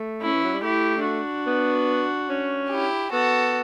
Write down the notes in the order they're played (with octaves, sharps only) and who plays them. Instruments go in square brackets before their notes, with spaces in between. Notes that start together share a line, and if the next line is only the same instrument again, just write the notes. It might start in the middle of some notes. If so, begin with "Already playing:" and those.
Already playing: [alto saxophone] A3
[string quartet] C#4 E4
[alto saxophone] E3
F#3
G3
[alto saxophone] A3 [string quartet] E4 G4
[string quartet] D4 F#4
[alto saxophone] B3
C#4
[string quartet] E4 G4
[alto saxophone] B3 [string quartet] F#4 A4